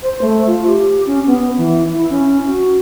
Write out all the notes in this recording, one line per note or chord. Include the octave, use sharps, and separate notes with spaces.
C5
A3
F4
G4
C#4
B3
E3
E4
C#4
F#4